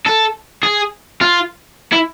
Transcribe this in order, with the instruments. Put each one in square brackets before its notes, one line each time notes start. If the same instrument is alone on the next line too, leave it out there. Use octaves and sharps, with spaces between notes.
[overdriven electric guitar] A4
G#4
F4
E4